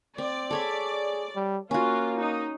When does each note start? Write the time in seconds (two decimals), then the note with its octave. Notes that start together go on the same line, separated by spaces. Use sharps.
0.18 C4 D5
0.51 G#4 A4 C#5 B5
1.35 G3
1.71 A#3 C#4 F4 F#4
2.19 D#4